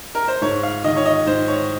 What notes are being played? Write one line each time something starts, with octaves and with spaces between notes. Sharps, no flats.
A#4
C5
G#2 C#5
F5
D#3 D#5
C#5
D#5
G#2 C5
C#5